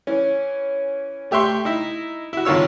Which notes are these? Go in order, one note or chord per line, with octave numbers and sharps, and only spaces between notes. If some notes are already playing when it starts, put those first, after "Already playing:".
E3 C#4
A3 G4 E5 G5 C6 C#6
D#4 E4
E4 F#4
G#1 D#3 F4 C#5 E6